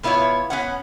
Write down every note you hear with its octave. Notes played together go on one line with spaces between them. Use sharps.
B2 B3 E4 F4 C#5
B3 C#4 F#5